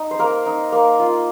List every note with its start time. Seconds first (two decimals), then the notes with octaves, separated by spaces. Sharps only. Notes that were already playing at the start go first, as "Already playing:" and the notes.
Already playing: D#4
0.11 C5
0.19 A#3 A#4
0.46 D#4
0.72 A#3
1.00 F4